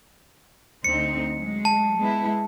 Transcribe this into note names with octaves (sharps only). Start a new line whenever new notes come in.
D2 C4 D#4 C#7
F#3 G#3
A5
G#3 B3 E4